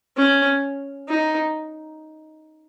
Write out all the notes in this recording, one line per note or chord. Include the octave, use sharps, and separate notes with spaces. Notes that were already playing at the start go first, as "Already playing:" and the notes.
C#4
D#4